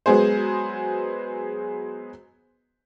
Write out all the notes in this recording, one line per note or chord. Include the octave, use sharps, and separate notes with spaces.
F#3 G#3 B3 G#4 C5